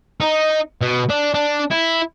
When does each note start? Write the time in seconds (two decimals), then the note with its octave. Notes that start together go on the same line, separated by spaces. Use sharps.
0.20 D#4
0.81 B2
1.10 D4
1.34 D4
1.71 E4